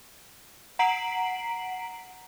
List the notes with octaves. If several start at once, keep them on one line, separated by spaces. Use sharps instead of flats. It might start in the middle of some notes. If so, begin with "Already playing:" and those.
F#5 A#5 B6 C7 D7 F#7